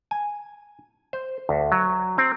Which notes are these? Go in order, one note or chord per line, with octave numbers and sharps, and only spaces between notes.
G#5
C5
D2
F#3
C4